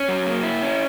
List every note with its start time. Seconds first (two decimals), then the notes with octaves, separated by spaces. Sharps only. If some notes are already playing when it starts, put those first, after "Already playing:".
Already playing: C#4
0.08 F#3
0.26 A#3
0.43 E4
0.62 C#4